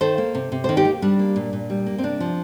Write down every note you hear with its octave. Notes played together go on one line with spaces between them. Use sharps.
D#3 A4 C5
A#3
C3
C3
D#3 A4 C5
D#4 G4
A#3
G3 D4
A#3
A#2
A#2
G3
A#3
C4
C3 D4
F3